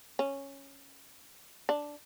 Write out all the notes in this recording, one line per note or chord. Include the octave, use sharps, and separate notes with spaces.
C#4
D4